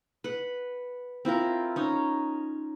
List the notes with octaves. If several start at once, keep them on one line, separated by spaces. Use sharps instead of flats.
B4 F#5
C4 E4 F4 A#4
C#4 D#4